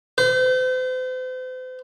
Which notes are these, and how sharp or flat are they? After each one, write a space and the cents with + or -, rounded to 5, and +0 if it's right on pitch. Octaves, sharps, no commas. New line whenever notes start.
C5 -40